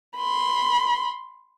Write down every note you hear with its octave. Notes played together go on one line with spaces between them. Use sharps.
B5 C6